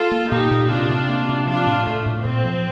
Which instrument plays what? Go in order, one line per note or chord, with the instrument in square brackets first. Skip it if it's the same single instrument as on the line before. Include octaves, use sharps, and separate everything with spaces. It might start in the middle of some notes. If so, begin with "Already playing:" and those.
Already playing: [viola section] F4 A4
[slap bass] A#3
[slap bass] A#2 [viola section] D#4 G4
[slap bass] A#2
[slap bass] C3 [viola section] D4 F4
[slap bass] C3
A#3
C3
[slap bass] F3 [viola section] D4 F4
[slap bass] A2
[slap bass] A2 [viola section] A3
[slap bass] A2
[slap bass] A#2 [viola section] C4
[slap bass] F3